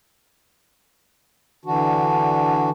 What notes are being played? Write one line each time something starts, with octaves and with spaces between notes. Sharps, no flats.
D3 E3 D4 F#4